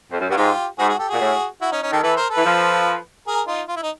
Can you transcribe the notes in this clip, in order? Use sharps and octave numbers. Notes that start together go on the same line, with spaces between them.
F2
F#2
G2 F#4
G#2 F4 G4
G#2 F#4 G#4
F#4 G#4
G4 A4
A#2 F#4 G#4
A2
E4 F#4
C#4 D#4
C#4 D#4
D#3 G4 A4
E3 A4 B4
A#4 C5
A4 B4
E3
F3
G#4 A#4
D#4 F4
F4
E4
D#4